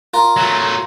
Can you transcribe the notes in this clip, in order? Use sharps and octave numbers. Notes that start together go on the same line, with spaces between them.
F4 A#4
F#3 A3